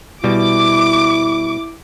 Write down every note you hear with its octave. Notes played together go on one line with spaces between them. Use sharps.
B2 G3 E4 D6